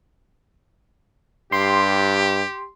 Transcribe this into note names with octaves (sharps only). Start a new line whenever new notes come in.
G2 G4 C6